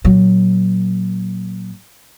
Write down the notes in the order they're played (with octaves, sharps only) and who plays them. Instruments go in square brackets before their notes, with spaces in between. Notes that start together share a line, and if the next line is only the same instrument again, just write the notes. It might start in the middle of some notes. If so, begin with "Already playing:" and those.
[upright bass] A#2 F#3